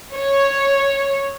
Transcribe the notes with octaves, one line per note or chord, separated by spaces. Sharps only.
C#5